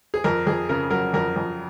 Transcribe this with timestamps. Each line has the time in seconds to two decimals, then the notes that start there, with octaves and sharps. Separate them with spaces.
0.14 G#4
0.24 F2 A#4
0.47 F2 G#4
0.69 C#3 A#4
0.91 F#3 A#4
1.14 F2 A#4
1.36 F2